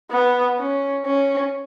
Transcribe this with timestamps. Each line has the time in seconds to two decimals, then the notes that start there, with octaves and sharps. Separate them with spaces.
0.11 B3
0.59 C#4
1.05 C#4